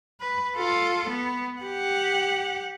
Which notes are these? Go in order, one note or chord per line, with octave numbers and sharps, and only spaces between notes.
B4
F4 A4
B3
G4 F#5